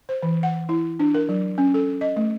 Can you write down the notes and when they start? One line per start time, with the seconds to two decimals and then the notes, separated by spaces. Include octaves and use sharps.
0.09 C5
0.23 E3
0.43 F#5
0.69 E4
0.99 D4
1.14 A#4
1.29 F#3
1.58 C#4
1.74 A4
2.01 D#5
2.16 A3